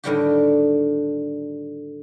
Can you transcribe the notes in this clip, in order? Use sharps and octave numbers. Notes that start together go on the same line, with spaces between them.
A2 D3 D#3 G3 F#4 G4